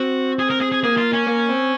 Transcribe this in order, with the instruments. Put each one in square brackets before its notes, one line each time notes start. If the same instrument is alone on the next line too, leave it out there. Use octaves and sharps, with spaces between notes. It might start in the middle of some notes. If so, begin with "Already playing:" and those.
Already playing: [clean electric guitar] C4 [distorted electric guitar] F#4
[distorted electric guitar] G#4
A#4
G#4
G#4
[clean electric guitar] A#3 [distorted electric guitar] G#4
[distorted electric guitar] F4
C#4
[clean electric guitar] A#3
C4